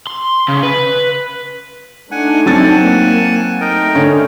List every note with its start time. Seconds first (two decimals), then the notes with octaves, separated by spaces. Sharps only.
0.07 C6
0.48 C#3
0.63 B4
2.11 A3 D4 D#4 F#5 G#5
2.46 F#3 C4 F#5 G#5 A5 A6
2.82 A#3
3.61 A3 D#4 A#4 G5
3.95 D3 C#4